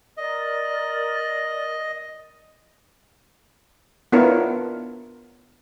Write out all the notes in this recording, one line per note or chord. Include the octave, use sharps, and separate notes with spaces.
A#4 D5 D#5
B3 D4 E4 F4 A#4 C#5